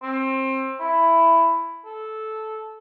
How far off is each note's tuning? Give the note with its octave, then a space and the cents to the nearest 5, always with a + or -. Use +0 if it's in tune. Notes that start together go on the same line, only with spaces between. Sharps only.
C4 +25
E4 +10
A4 -10